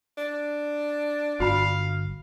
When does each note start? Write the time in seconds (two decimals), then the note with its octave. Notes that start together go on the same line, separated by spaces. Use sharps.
0.18 D4
1.40 G1 F#4 F5 B5